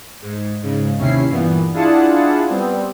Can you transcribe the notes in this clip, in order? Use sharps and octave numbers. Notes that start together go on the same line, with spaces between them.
G#2
G#2 C#3
D#2 C3 C#4 E4 C7
G2 A#2 E3 B3
D4 E4 F4 G#4 F#5 A5
G3 B3 C4